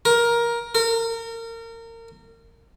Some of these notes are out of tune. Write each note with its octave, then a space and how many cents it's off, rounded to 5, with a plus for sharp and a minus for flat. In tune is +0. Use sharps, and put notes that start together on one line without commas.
A#4 +15
A#4 -30